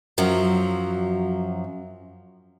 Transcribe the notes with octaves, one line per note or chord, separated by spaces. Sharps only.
F#2 F3 F#3